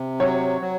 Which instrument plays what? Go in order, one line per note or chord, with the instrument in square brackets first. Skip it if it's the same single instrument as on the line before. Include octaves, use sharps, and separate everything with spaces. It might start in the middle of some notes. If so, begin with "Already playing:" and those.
Already playing: [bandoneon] C3
[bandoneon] F#3 [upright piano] C#5
[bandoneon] F#3